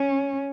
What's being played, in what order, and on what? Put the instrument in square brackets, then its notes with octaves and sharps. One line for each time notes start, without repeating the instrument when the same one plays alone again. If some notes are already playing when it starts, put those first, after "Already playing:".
Already playing: [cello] C#4